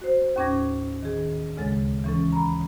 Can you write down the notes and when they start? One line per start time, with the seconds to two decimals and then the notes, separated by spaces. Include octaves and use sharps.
0.02 F#4 C5
0.36 D#2 A2 C#4 D6 G#6 A#6
1.02 D#3 G#4
1.57 D2 C#3 G#3 A4 A6
2.04 E3 C#4 A4
2.32 A#5 B5